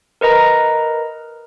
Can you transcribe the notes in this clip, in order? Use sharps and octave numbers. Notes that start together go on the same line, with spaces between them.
A#4 B4 D#5 A#5